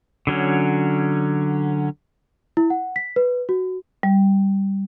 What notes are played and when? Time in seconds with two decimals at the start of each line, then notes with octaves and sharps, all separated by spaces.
0.27 D3 F#3 C#4
2.57 E4
2.70 F#5
2.96 B6
3.16 B4
3.49 F#4
4.03 G3